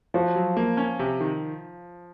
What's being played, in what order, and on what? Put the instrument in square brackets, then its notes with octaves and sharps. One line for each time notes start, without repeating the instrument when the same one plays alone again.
[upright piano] F3 [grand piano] F#4
[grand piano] F#3
A#3
C#4
C3
D#3